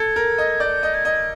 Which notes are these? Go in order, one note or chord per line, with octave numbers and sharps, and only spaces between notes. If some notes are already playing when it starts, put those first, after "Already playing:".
Already playing: A4 G#6
A#4
D#5
D5 G6
D#5
G#6
D#5